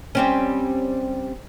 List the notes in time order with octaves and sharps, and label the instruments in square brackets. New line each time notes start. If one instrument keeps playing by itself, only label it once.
[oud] G3 C4 C#4